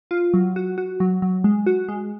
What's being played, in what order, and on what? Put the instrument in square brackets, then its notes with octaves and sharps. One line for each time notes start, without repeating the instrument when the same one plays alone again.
[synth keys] F4
F#3
F#4
F#4
F#3
F#3
G#3
F#4
G#3